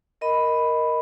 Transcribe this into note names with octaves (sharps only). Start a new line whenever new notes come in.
A#4 D#5 B5